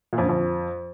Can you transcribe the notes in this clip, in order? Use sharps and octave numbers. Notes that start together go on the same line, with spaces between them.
A#2
F2
D3
F2